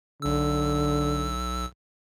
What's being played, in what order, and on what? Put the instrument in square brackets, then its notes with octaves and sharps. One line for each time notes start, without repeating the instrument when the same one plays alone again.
[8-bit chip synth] B1 E6 [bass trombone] D3